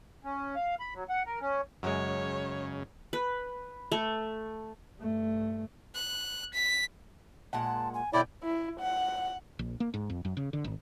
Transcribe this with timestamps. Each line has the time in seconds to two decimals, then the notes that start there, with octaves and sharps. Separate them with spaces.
0.24 C#4
0.56 F5
0.80 B5
0.94 F#3
1.09 F#5
1.26 A#4
1.41 C#4
1.83 F#2 C#3 G#3 C#5
3.13 B4
3.92 A3
4.97 G2 A3
5.95 F#6
6.54 B6
7.53 A#2 G#3 F#5 A5
7.94 G#5
8.13 B2 D3 E4 C#5 D5 G5
8.43 E4
8.80 F#5
9.59 A#1
9.80 A#3
9.94 G#2
10.10 F2
10.25 F#2
10.37 C#3
10.53 D3
10.64 G#1